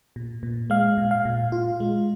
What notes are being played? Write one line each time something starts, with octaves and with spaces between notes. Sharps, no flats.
A#2
A#2
G#3 F5
A#2
F5
A#2
F4
G#3